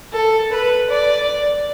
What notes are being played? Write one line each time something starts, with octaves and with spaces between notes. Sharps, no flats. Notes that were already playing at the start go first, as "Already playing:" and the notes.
A4
B4
D5